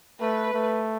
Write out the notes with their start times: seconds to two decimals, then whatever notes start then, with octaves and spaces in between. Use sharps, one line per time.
0.21 A3 B4
0.54 A3